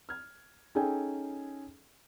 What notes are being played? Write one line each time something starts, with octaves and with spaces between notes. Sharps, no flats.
F6 G#6
C#4 D#4 G#4 A4 G5 G#5